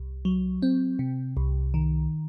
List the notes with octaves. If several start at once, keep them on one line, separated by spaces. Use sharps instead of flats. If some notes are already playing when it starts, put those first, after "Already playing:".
Already playing: C2
F#3
C4
C3
C2
D#3